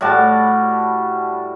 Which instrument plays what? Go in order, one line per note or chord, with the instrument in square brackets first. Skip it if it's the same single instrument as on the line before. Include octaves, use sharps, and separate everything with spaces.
[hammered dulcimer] A2 G3 F#4 A5